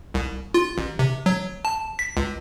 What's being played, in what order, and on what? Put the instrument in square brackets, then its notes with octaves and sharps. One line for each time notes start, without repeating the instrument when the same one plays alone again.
[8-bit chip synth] C2
F4
A1
C3
F#3
A5
B6
C#2